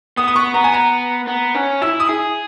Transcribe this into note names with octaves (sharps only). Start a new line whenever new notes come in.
B3 D#6
D#6
B3 C#6
B3 A#5
G#5
A#5
B3
C#4
E4 E6
D#6
G#4